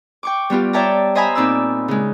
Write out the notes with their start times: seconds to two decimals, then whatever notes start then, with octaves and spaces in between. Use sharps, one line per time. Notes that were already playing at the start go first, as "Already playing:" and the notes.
0.23 G5 C#6 D6
0.50 G3 B3 F4 G4
0.73 C#5 D5 E5 G5 A5 A#5
1.15 C5 D#5 E5 G#5 A#5 B5
1.35 A#2 C4 D#4 D5 B5 E6
1.88 C#3 G#3